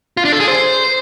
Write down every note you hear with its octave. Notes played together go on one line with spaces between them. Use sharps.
F4
D4
A4
G#4
C5